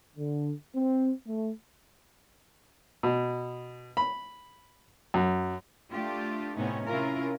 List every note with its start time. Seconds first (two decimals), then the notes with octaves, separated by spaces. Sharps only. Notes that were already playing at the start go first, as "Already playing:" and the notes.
0.16 D3
0.74 C4
1.26 A3
3.03 B2
3.97 B5
5.14 F#2
5.91 A3 D4 F4 G4
6.55 A2 C3 B3 C#4 D#4
6.85 C3 C#4 E4 F4 A#4